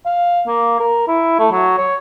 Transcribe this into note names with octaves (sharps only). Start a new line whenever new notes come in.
F5
A#3
A#4
E4
A3
F#3
C#5